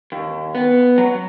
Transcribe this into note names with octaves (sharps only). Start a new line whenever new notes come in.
D#2
B3
F#3